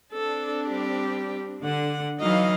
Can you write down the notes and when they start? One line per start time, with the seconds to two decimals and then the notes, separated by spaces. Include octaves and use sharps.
0.13 C4 D4 A4
0.68 G3 G4
1.63 D3 F#5
2.20 E3 F#3 D#4 D#5 F5